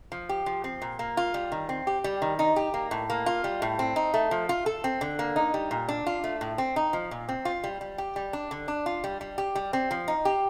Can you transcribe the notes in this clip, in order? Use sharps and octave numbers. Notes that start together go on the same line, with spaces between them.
F3
G4
F3
C4
A#2
A#3
F4
G3
D#3
C4
G4
G3
D#3
D#4
G4
A#3
A2
A#3
F4
G3
A2
C4
D#4
A3
F3
F4
A4
C4
D3
A#3
D#4
G3
A#2
D4
F4
A3
A2
C4
D#4
F3
A#2
C4
F4
G3
G3
G4
G3
D4
D3
D4
F4
G3
G3
G4
G3
C4
F3
D#4
G4